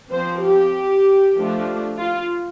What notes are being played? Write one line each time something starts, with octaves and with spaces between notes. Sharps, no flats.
F3 C4 C5
G4
F3 A3 D4
F4